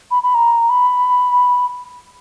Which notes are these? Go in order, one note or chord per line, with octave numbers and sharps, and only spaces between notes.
B5
B5
A#5
B5